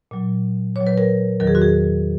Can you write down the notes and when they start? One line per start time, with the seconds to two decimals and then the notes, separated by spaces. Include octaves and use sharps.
0.11 A#2 F#3
0.76 A#2 F#3 C#5
0.87 B4
0.98 A#4
1.40 E2 D#3 F#3 A#4
1.47 G#4
1.55 F#4
1.61 G#4